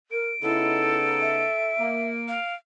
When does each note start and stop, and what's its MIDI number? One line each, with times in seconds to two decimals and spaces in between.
0.11 0.31 70
0.11 2.53 98
0.42 1.47 49
0.42 1.47 59
0.42 1.47 63
0.42 0.98 64
0.42 1.72 69
1.21 2.09 76
1.79 2.34 58
2.28 2.54 77